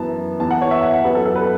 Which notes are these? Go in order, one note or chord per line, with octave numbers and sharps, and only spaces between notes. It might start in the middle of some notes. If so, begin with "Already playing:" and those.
Already playing: F#2 E3 B3 E4 A5
E2 E3 B3 E4 A5
F#5
C#5
E5
F#5
F#5
F#2 F#3 B3 B4
A4
A4
B4